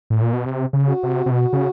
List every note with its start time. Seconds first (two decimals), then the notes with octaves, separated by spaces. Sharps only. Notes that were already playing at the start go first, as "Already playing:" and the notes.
0.10 A2
0.22 A#2
0.33 B2
0.46 C3
0.73 C#3
0.88 F#4
1.03 C3
1.26 C3
1.31 B2 F#4
1.53 C#3